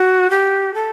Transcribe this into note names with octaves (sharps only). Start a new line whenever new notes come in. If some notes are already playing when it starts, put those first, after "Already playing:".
Already playing: F#4
G4
A4